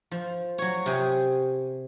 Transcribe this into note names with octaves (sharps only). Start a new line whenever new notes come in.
F3
F#3 C#5
C3 G4 G#4